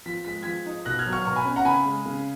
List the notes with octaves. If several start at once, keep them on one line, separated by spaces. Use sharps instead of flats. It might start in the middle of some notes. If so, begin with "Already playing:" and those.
F3 B6
G#3 B6
F3 G#6 B6
D#4
B2 F#6 A#6
F6 G#6
F#3
C#6 F6
B2 A#5 C#6
G#5 B5
C#4
F#5 A#5
C#3 G#5 B5
G#3
C#3